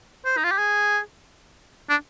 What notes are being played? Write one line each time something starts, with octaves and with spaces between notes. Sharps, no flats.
C5
D#4
F4
G4
G#4
D4